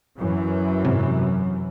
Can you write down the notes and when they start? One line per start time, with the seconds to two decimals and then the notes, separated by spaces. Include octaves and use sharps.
0.19 F#2 E3
0.85 G#2 C3